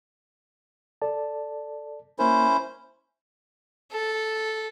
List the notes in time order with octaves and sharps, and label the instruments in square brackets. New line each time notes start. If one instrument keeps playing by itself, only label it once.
[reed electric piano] A4 D5 A5
[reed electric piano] A#3 A#4 [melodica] C#4 E4 C5
[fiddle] A4